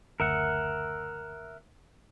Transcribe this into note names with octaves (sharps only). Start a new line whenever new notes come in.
F#1 D2 A#4 E5 F#5